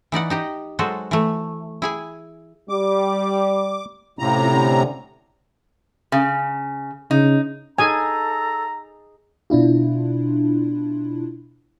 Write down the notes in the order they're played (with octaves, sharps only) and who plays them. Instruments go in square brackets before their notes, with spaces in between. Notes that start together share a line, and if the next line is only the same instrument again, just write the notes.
[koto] E3 D#4 D5 F#5
D#4 G4 D#5
F#3 G#3 F#4 A4 C5
E3 A3
E4 G#4 G#5
[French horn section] G3 [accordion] D6
[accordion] A2 C3 A#5 [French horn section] C#4 F4
[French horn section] D3 C#4
[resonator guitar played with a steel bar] C#3
[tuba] C#3 [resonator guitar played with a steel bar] D#4
[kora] D#4 G#4 D#5 [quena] A4 [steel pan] G#5 [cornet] A#5
[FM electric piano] B2 D4 E4 F4